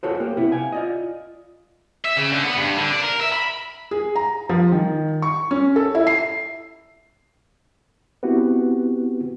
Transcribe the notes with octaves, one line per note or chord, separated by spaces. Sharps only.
F4 F#4 G#4 A4 C5 C#5
A#3 G4
C3 B3 C4 E4
F5 G#5
F4 D5 D#5
E5
C#3
D3
B3
G2
D3
D4
A#4
E5
B5
G#4
A#5
F3
D#3
C#6
C#4
A4
E4
C7
B3 C4 E4 F#4 G4 B4